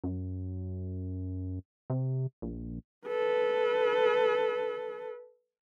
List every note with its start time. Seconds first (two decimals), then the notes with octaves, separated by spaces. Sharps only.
0.04 F#2
1.90 C3
2.42 A#1
3.06 A4 B4